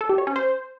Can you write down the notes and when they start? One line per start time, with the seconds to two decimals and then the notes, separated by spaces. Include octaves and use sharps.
0.01 A4
0.09 G4
0.18 C#5
0.27 C#4
0.36 C5